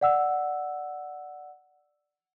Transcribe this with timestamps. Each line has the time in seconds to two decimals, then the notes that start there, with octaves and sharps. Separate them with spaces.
0.01 D5 F#5 E6